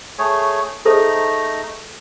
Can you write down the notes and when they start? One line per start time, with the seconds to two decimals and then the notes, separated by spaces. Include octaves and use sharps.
0.18 A3 G#4 C#5
0.85 A3 D#4 G#4 A4 C5 A#5